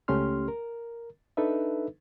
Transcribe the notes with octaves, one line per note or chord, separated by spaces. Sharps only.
C#2 A3 C#4 G4 C6 F6
A#4
D4 D#4 A4 B4 E5